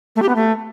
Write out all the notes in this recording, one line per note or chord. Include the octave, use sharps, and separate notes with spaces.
A3
G4
B3
A3